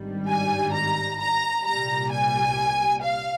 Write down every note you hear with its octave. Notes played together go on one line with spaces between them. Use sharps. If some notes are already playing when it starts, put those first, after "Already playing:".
Already playing: G#1 G2 D#3 G3
G#5
A#5
A#5
C2 A#2 G3 A#5
G#5
F5